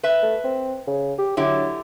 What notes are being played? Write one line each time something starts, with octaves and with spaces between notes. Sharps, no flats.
B4 E5
A3
C4
C#3
G4
D3 F#3 E4 G4